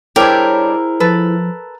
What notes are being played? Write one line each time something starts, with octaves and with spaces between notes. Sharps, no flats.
G3 D4 E4 G#4 A#4 C5 C#5 G5
F3 A4 B4